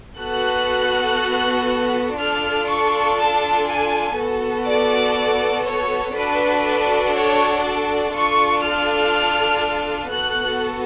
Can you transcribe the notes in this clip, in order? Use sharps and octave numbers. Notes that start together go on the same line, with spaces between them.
B3 F#4 A4 F#6
D4 F4 A4 F6
C#6
A5
G#5
B3 F#4 A4
D5
C#5
D4 F#4 A4 B4
C#5
D5
D4 F4 A4 C#6
F6
B3 F#4 A4 F#6